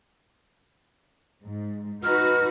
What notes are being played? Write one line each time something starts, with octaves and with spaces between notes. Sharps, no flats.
G#2
D#4 F#4 B4 F6